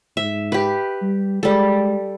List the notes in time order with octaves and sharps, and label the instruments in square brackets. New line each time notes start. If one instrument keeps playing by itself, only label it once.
[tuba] G#2 [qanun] E5
[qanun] G4 B4
[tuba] G3
[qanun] G3 A4 [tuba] G#3